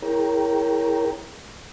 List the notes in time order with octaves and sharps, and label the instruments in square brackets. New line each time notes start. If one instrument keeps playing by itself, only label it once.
[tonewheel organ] E4 G#4 A#4 C#5 G5 A#5